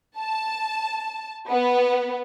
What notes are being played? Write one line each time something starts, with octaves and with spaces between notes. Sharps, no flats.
A5
B3